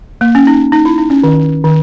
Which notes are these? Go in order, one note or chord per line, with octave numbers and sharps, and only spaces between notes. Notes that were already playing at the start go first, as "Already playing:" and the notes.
A#3
C#4
D#4
D#4
E4
D#4
C#4
D#3
D#3